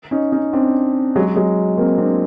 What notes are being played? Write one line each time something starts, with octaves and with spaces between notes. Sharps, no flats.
C#4 D#4
C#4 D#4
C4 D4
F#3 G#3
F#3 G#3
A#3 C4
C4 D4